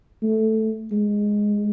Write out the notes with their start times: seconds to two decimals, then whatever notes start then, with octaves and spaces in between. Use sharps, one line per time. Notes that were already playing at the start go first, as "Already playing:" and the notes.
0.23 A3
0.92 G#3